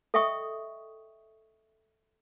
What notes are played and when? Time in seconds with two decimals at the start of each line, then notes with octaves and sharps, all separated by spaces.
0.14 A4 D#5 E5 G5 C#6 D#6